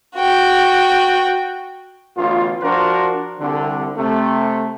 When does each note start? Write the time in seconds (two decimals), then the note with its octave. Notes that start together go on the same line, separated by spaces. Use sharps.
0.16 F#4 G5
2.17 A1 D2 B2 F4
2.62 F3 D4 F#4 A#4 C5
3.40 C2 D3
3.97 C3 A3